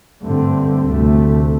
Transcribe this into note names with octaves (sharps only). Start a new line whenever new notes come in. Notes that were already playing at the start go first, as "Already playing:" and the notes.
G2 D3 A3 C4
D2 C3 A3